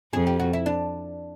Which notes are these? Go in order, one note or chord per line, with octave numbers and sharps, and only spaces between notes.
F2 G#4
G4
F#4
E4
D4